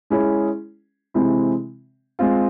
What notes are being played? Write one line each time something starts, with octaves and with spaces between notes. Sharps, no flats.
G#3 C#4 E4 G#4
C3 E3 G#3 C4 E4
G#3 C4 F4